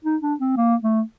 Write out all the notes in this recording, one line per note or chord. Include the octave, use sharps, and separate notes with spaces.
D#4
D4
C4
A#3
A3